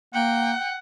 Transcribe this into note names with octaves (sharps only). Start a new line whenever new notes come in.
A#3 F#5 G5